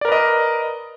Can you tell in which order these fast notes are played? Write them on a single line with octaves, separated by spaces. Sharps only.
D5 A#4 B4 D#5